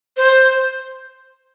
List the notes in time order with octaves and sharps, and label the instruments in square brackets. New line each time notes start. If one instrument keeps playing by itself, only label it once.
[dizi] C5